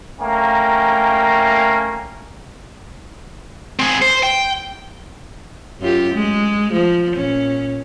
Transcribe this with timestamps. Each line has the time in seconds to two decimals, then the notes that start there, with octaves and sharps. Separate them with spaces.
0.21 A3 A#3 C#4 G5 A#5
3.79 C4 G#4
4.02 C5
4.23 G5
5.80 F#2 F4 G4
6.14 G#3
6.72 F3
7.14 A#2 C#4